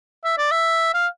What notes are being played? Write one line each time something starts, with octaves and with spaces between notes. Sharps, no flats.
E5
D5
E5
F5